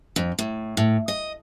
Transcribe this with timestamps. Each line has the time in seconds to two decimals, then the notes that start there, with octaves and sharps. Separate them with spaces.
0.16 F2
0.39 A2
0.77 A2
1.08 D#5